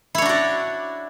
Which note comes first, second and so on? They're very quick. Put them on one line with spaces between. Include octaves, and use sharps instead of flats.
E4 C#5 D4 F#4 D5